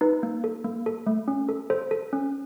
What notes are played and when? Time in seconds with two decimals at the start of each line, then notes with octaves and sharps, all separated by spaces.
0.01 D#4 B4
0.23 A#3
0.44 A4
0.64 A#3
0.86 A4
1.07 A3
1.28 C#4
1.49 A4
1.70 A4 C5
1.91 A4
2.13 C#4